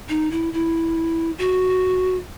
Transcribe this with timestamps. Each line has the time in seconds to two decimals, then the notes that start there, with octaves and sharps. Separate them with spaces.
0.09 D#4
0.32 E4
0.53 E4
1.38 F#4